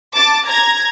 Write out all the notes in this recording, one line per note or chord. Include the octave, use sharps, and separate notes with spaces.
A5 D6 A6
A#5 G#6 A#6